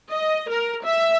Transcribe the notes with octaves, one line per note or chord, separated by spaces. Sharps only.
D#5
A#4
E5